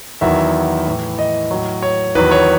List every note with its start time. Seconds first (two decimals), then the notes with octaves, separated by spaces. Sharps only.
0.21 E2 D#3 F#3 E5
0.86 A2 E3
1.19 D#5
1.51 A2 F#3
1.83 C#5
2.15 E2 D#3 F#3 B4
2.31 C#5